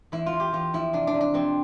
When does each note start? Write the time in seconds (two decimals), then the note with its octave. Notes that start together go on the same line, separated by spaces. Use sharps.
0.12 E2 E4
0.26 F4
0.33 E2
0.40 G4
0.53 E2 F4
0.73 F3 E4
0.93 C3 D4
1.07 D4
1.14 C3
1.21 D4
1.34 F2 C4